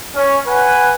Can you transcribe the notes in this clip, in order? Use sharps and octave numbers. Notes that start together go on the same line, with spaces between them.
C#4
B4 F#5 G#5